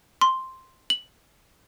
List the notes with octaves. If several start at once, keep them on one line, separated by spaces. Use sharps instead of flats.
C6
F#7